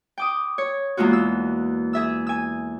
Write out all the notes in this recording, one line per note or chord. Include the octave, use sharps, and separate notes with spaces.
G5 D6 D#6
C#5
E2 G#3 A#3 F4 F#4
E6
G#4 E5 E6
G#5 E6